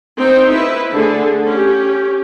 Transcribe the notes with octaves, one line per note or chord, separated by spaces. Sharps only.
C4 D#4 G5
E4 B4 E5
D3 A3 G#4 A4
C#4 G4